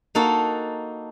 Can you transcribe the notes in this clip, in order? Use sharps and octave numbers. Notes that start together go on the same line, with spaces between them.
A#3 D#4 F#4 A4